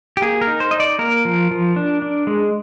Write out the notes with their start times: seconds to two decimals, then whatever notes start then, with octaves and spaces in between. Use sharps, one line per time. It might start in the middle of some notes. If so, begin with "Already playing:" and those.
0.17 G4
0.22 A#3 G#4
0.41 A#4
0.47 D#4
0.60 C5
0.71 D#4 D#5
0.80 D5
0.99 A#3 A#4
1.25 F3
1.51 F3
1.76 D4
2.02 D4
2.27 G#3